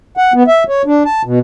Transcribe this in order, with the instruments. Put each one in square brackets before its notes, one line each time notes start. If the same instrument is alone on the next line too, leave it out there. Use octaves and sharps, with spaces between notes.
[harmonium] F#5
B3
E5
C#5
D4
A5
B2